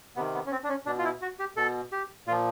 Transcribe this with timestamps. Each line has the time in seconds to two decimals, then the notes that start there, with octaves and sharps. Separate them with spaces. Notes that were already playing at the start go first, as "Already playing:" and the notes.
0.16 C3 D#3 B3
0.34 B3
0.46 C#4
0.52 C4
0.64 D4
0.69 C#4
0.86 B2 D4
0.99 F4
1.04 E4
1.22 F#4
1.39 G4
1.57 B2 A4
1.92 G4
2.27 A#2 F4
2.31 F3